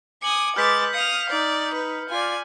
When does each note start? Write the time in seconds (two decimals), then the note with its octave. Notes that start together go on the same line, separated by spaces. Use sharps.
0.22 G#5 D6 D#6 C#7 F#7
0.56 G#3 B4 D6 F6 G6 A6 B6
0.94 F5 D#6 B6 C#7 F7
1.30 D#4 D5
1.74 B4
2.10 F4 D5 G#5